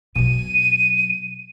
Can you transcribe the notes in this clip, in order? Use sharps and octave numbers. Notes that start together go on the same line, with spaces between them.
B2 F#3 D#7